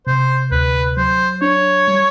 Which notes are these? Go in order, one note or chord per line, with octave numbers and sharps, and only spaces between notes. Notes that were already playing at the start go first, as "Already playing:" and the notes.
C3 C5
D2 B4
F#3 C5
D4 C#5
G3